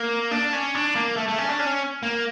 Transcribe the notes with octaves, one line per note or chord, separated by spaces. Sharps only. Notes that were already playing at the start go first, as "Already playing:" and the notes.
Already playing: A#3
D4
C#4
D4
A#3
A3
A3
C#4
D4
C#4
A#3